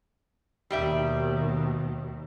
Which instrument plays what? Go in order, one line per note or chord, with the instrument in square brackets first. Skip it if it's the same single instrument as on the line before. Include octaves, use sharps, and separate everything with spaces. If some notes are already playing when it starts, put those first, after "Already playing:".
[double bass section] D#2 B2 D#3 [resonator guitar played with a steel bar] G3 G4 E5